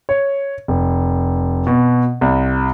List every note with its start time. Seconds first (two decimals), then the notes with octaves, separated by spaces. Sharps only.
0.09 C#5
0.68 F1
1.67 B2
2.21 C2